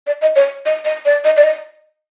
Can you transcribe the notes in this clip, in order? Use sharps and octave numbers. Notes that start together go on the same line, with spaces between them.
D5
D#5
C#5
D#5
D#5
D5
D#5
D5
D#5